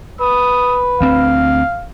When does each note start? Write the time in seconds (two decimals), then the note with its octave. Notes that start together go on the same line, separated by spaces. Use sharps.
0.20 B4 D#6
1.01 D2 C4 F5